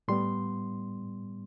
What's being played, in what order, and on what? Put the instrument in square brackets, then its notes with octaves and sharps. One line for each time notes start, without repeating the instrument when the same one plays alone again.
[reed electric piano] A2 G3 B3 C6